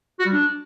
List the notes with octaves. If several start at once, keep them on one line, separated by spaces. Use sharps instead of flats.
F#4
G3
D4